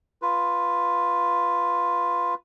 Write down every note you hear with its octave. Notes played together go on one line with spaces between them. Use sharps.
F4 B4